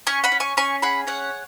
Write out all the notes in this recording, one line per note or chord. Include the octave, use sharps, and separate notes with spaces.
C#4 G#5 C#6
F#5 B5
C#4
G#5 C#6
C#4 G#5 C#6
G#4 F#5 B5
C#4 C#5 F#5